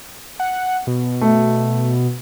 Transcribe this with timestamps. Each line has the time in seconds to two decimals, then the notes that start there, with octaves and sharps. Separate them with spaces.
0.40 F#5
0.87 B2
1.21 A3